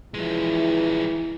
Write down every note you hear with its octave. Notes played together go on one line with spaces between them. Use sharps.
E3 F3 G#3